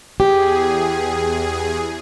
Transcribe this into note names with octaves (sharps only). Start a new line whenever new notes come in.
E2 G4 G#4